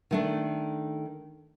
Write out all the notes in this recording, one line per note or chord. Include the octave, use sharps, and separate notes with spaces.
D#3 A3 D4